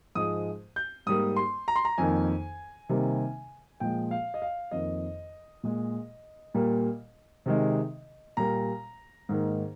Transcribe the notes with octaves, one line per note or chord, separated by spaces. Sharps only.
G#2 F3 G#3 D#6
G6
G#2 G3 A#3 D#6
C6
A#5
C6
A#5
F2 D#3 A#3 G#5
C3 D#3 G3 A#3
A#2 F3 G#3 G5
F5
D#5
F5
F2 D#3 A#3 D#5
A#2 G#3
A#2 G3 A#3
C3 D#3 G#3
A#2 G3 A#3 A#5
G#2 D#3 A#3